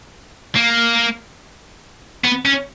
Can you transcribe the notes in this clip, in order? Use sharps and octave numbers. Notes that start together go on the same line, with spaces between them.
A#3
B3
C#4